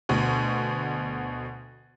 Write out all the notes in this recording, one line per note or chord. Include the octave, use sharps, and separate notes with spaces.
D2 B2